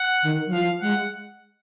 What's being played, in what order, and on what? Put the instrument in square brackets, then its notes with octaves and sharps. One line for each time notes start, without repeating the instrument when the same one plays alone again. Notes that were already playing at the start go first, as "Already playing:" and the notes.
Already playing: [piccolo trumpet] F#5
[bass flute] D#3
F#3
[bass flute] F3 [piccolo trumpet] F5
[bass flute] G#3 [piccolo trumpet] F#5